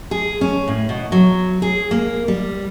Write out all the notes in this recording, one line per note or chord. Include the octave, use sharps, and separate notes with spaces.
G#4
C#4
A2
B2
F#3
G#4
A#3
G3